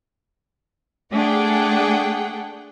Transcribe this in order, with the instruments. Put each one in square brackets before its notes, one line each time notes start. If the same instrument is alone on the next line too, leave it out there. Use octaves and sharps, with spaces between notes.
[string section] A3 D4 G#4 F#5 G5